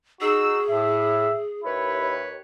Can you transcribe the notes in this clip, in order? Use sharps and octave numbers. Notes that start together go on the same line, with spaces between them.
D#4 F#4 G#4 E6
A2 E5
D#2 E4 B4 C#5